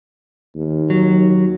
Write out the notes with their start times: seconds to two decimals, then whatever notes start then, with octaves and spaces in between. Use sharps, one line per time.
0.55 D#2
0.90 F#3